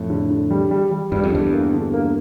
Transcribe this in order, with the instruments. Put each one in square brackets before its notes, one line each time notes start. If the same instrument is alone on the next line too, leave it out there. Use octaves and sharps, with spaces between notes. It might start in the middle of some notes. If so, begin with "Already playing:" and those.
Already playing: [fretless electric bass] F2 A2
[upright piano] D3
D3
G3
G3
G3
[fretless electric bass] G2 [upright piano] G3
[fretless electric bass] F2
[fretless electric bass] E2 G2 [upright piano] D3
[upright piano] A#3
D3
A#3